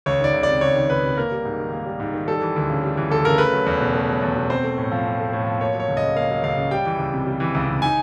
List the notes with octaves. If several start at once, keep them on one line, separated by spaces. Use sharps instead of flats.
C#2 C#5
D#3 D5
C#2
C3 D5
C#2 C#5
D#3
C#2 B4
C3
A#3 A#4
G3
G#2
D#3
A#3
G3
G#2
D#3
G3 A4
E3
D2
C#3
G3
E3
D2 A4
C#3 A#4
A3 B4
F#3
E2
B2
A3
F#3
E2
B2
C4 C5
A3
A2
F3
C4
A3
A2
F3
A#3 C#5
F#3
C#5
C#2
D#5
C#3
A#3 F5
F#3
C#2 F5
C#3
G3 G5
E3
C#2
C3
G3
E3
C#2
C3
D#4 G#5